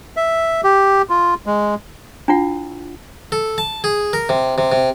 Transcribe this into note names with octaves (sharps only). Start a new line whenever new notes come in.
E5
G4
F4
G#3
D4 E4 F4 F#5
A4
A5
G#4
A#4
C3
C3
C3